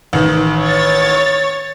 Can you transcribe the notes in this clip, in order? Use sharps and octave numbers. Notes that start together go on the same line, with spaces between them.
A1 D#3
C#5 A6